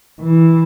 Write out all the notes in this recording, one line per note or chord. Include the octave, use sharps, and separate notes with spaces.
E3